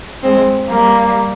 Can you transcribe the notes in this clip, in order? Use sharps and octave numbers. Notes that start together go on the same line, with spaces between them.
G#3 C4
G3 A#3